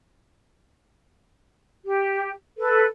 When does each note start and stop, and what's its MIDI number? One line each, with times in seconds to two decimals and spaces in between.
1.85 2.31 67
2.57 2.85 69
2.57 2.85 71